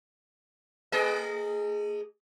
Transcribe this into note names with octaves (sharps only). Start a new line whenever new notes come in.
A3 G#4 D#5